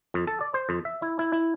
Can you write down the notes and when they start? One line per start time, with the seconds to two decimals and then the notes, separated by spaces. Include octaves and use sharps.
0.14 F2
0.27 A4
0.41 D5
0.54 C5
0.69 F2
0.85 E5
1.02 E4
1.19 E4
1.32 E4